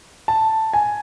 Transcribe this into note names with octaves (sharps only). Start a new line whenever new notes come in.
A5
G#5